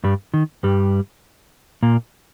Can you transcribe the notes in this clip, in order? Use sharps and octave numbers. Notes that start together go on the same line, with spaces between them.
G2 G3
D#3
G2 G3
A#2 A#3